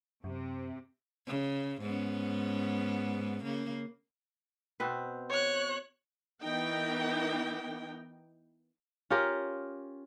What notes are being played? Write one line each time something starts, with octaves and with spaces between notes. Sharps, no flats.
F#2 C3
C#3
G#2 B3 C#4
C#3 A#3
B2 C4 B4
C#5 F#6
E3 B3 D#4 A#4 G5
C#4 F4 G4 A#4